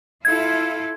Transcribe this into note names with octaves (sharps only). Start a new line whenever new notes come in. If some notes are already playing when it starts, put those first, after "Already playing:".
E4 F4 A4 G#6